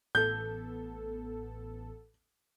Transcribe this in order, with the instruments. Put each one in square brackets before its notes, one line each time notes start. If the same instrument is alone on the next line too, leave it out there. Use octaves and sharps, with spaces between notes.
[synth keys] A1 B3 A4 [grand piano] G6